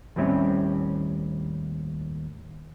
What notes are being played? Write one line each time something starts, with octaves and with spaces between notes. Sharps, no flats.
D#2 A2 G3 C4 C#4 E5